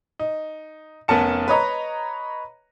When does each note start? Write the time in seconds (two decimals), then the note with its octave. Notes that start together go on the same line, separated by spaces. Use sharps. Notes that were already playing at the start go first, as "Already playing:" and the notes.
0.19 D#4
1.08 F1 B3 C#4 A#4 A5 C#7
1.48 B4 C#5 D#5 A#5